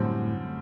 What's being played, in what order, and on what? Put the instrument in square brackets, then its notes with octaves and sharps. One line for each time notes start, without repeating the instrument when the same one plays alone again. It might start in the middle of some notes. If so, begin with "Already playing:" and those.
Already playing: [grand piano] F#2 D3 G3 C4 [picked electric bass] A2